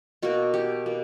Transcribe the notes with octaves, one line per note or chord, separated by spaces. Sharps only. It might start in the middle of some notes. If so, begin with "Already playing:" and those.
B2 A#3 F#4
G4
B2 A#3